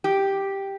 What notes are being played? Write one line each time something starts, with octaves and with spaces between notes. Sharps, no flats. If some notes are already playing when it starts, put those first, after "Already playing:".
G4